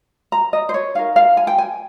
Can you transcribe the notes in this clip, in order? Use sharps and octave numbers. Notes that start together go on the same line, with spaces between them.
A#5
D#5
C5
C#5
D#4 A#4 F5
F5
G#5
G5
G#5